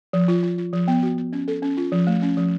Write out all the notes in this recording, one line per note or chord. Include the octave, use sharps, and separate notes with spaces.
F3
F4
F4
F4
F3
B3
F#4
B3
C#4
A4
C#4
F4
F3
A3
C#4
F3